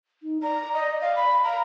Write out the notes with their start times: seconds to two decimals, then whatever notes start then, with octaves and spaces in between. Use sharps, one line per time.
0.23 D#4
0.42 D5 A#5
0.74 D#5
1.01 F5
1.16 B5
1.44 F5 A#5